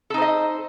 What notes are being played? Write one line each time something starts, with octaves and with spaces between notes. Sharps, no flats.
D#4 A4 C5 D#5